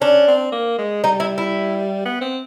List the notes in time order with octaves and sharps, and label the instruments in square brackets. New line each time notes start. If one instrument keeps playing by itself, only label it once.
[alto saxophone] C#4 [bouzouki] D4
[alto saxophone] C4
A#3
G#3
[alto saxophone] G3 [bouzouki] D#4
[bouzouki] E4
E4
[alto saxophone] B3
C4